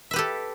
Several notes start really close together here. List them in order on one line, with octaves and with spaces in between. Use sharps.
E5 B4 G4 A4